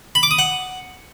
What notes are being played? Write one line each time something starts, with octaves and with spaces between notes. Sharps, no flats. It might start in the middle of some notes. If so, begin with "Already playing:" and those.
B5
D6
D#6
F#5